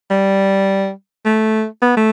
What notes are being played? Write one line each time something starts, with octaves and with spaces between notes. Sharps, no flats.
G3
A3
B3
A3